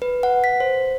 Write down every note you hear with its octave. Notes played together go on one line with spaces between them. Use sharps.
B4
F#5
B6
C5